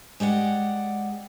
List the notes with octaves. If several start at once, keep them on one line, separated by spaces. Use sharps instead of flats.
G#3 G4 D5 F#5